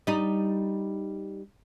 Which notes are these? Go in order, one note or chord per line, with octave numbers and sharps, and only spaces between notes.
G3 D#4